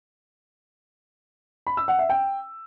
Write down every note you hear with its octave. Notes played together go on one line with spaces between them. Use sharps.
B5
E6
F#5
E5
G5